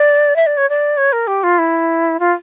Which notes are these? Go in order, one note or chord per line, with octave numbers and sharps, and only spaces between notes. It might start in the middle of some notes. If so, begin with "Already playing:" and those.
Already playing: D5
E5
D5
C#5
D5
C#5
A#4
G4
F4
E4
F4